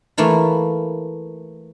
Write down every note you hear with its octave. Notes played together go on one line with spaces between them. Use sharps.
E3 A3 A#3 E4 F4